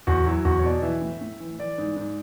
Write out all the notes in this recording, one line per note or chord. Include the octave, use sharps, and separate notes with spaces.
E2 F#4
F#3 E4
E2 F#4
C#5
B2 D5
E3 E5
A2
A2
E3
E3 D5
G#2
G#2